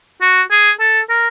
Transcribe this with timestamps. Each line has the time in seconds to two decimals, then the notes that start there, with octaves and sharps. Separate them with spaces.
0.22 F#4
0.51 G#4
0.80 A4
1.10 A#4